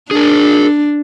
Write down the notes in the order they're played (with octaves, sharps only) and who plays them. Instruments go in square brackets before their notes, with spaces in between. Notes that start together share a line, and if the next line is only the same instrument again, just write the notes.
[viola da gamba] D4 [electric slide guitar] G#4 A#4